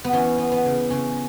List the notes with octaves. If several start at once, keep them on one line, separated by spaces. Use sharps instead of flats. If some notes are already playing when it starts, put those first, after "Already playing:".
B3
E3 C#4
B3
B3
C#3
C#3 C#4